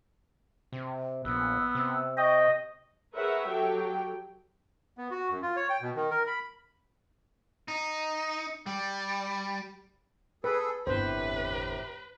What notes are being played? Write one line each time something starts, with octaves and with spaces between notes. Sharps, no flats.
C3
A#1 B3 E6
C3
D#5 G5 C#6
G#4 A#4 B4 C#5 E5 F#5
F#3 G4 A4 G5
B3
F#4
F#2
F4
C#5
G5
B2
D#3
A#4
B5
D#4
G3
G#4 A4 B4
G1 E2 A2 C3 B4 C5